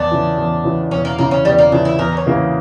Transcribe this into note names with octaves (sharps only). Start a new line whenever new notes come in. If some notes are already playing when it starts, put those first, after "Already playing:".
Already playing: E2 D4
C#3 E3
E2
C#3 E3
E2 C#4
A#3
C#3 E3 A#3
C#4
E2 G3
A#3
C#3 E3 D4
E4
E2 A#4
C#5
C#3 E3 A#3